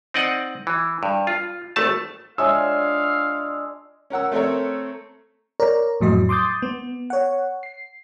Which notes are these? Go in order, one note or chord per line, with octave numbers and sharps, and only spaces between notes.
C4 D#4 D5 D#5 F#5
E3
G2
F4
G#1 A3 A5
G#3 D4 F4 C#5 E5 F5 G#5 E6
C#4 A#4 F#5 E6
A3 C4 A4 A#4 C#5
A#4 C#5 D5 A#5
F2 A2 F#3 D#5
C6 D6 D#6 G6 A6
B3
C#5 F#5
C7